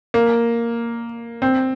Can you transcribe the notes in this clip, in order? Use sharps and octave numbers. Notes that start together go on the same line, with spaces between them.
A#3
C4